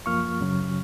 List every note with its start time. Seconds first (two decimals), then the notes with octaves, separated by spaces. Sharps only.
0.06 F#2 F3 A#3 F4 C#6 F6
0.41 F#2 C#3 F#3 C#4